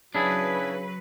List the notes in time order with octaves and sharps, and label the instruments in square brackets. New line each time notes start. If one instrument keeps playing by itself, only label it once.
[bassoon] C#3 [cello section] F#3 B4 [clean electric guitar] D4 E4 G#4